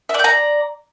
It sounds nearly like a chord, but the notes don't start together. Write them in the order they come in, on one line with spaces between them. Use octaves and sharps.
E5 D5 G5 A#5